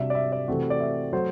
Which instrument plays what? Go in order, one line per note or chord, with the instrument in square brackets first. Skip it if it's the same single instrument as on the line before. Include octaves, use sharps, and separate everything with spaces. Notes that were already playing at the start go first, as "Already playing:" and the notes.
Already playing: [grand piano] C3 G3 D4 F#4 [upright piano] E5
[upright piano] D5
E5
D5
[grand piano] C3 E3 A3 C4 F#4
[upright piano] D5
E5
[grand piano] F#3 A3 [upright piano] C5